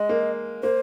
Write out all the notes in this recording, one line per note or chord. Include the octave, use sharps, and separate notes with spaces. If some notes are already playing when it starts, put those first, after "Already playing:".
Already playing: G#3 D#5
A#3
A#3 C5